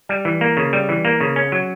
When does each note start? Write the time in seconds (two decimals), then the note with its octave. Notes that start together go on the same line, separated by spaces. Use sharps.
0.09 G3
0.25 E3
0.41 A#3
0.57 C#3
0.73 G3
0.89 E3
1.05 A#3
1.21 C#3
1.36 C#4
1.52 F#3